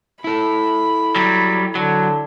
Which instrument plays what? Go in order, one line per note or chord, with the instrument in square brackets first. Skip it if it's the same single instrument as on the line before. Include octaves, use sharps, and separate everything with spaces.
[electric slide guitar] E4 A4 [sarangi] B5
[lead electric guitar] F#3 G3
[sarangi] D3 [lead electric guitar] F#3